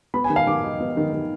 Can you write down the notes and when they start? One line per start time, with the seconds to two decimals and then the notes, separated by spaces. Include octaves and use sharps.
0.14 B3 B5
0.24 G#5
0.30 D#3
0.36 F5
0.47 D#3 D6
0.64 D#4
0.80 B3
0.97 D#3
1.13 D#3